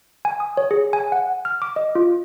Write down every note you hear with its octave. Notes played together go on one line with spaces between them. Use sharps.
G#5
D#6
C#5
G#4
G#5
F#5
F6
D6
D#5
F4